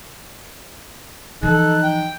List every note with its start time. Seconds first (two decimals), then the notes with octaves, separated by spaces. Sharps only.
1.43 E3 F3 D#4 A4 F#6
1.83 G5